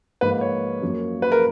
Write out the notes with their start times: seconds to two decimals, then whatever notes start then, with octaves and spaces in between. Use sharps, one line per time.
0.21 G#2 F3 A#3 B4
0.41 C#5
0.82 F#2 F3 A#3
1.22 B4
1.32 A#4